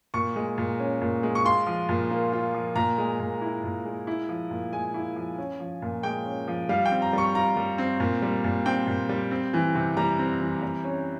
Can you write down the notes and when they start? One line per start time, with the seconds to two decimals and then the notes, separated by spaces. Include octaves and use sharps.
0.14 A#2 C#6
0.36 G#3
0.58 A#2
0.80 C#4
1.01 A#2
1.23 G#3
1.35 C#6
1.45 F4 C6
1.67 F3
1.89 A#2
2.10 A#3
2.32 F4
2.54 F3
2.76 A#2 A#5
2.98 G#3
3.20 A#2
3.41 E4
3.64 A#2
3.85 G#3
4.07 E4
4.29 F3
4.51 A#2
4.72 G#3 G#5
4.94 E4
5.16 F3
5.38 C#4
5.60 F3
5.82 A#2
6.03 G#3 G5
6.25 C#4
6.48 F3
6.69 G3 F5
6.85 G5
6.91 C4
7.02 A#5
7.13 G3 C#6
7.35 F4 A#5
7.57 G3
7.78 C4
8.00 A#2
8.22 G3
8.44 A#2
8.66 C4 G5
8.87 A#2
9.09 G3
9.31 C4
9.53 E3
9.75 C3
9.97 G3 A#5
10.19 C4
10.40 E3
10.62 G3
10.84 C#4